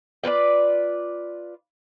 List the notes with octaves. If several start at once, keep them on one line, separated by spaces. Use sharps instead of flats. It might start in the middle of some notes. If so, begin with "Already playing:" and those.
F4 B4 C5 D5